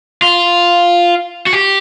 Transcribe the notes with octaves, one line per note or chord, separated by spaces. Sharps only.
F4
F#4
G4